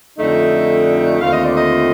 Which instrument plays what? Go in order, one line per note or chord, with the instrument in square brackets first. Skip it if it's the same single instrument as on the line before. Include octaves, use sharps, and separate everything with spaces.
[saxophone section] F2 D3 A3 D#4
D#2 D3 A3 C4 F4 F5
D#5
D5
D#5